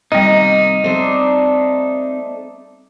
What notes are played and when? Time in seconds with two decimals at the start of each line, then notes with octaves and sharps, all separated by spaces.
0.12 C3 D#3 G3 A#3 D#4 D#5
0.84 A3 C4 D4 C5